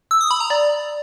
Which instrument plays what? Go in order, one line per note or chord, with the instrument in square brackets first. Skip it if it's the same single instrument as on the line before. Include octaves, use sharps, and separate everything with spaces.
[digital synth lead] E6
D#6
B5
A#5
D5